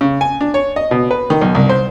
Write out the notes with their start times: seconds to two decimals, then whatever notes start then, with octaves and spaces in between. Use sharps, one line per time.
0.01 C#3
0.21 G#5
0.41 D4
0.54 C#5
0.76 D#5
0.91 B2
1.11 B4
1.30 D#3
1.41 B1
1.55 C2
1.69 C5